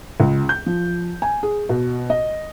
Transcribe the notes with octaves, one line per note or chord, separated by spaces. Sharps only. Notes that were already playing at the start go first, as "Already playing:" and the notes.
C#2
G6
F3
G#5
G#4
B2
D#5